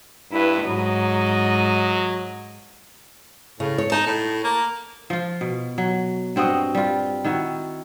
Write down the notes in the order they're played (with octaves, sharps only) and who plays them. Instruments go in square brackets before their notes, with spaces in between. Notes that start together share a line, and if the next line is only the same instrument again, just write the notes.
[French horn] G2 [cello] E4 B4
[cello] G#2 D#5 [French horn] F#3
[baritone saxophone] A2 [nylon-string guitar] C#3
[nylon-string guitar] C#5
[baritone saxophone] D#4 [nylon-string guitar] A5
[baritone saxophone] A2
A#3
[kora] F3 F4
B2
F#3
G2 C4 F#4 D#5
G3 F4
D#3 E4 F#4